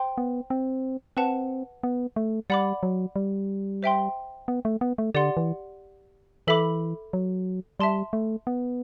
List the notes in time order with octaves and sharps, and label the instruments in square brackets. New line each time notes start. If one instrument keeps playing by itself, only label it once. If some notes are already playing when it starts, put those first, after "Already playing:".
Already playing: [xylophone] C5 G5 C6
[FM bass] B3
C4
[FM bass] C4 [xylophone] B4 F#5 A5
[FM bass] B3
A3
[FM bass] G3 [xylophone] D5 F#5 B5 D6
[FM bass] F#3
G3
[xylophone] C5 E5 G5 C6
[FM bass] B3
A3
B3
A3
[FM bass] D3 [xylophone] G4 D5 F#5 C6
[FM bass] E3
[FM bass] E3 [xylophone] A4 E5 B5 D6
[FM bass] F#3
[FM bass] G3 [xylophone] E5 A5 C6
[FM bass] A3
B3